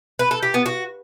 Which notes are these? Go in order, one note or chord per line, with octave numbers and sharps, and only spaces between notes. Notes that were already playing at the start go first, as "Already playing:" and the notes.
B4
A4
G4
B3
F#4